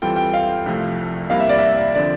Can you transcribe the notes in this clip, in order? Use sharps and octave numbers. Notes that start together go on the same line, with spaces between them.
E3 G3 C4 F4 A4 G5
G5
F5
C2 C3 F3 A3
C3 G3 A#3 E4 A#4 F5
E5
D5
E5
D3 F3 C4 D5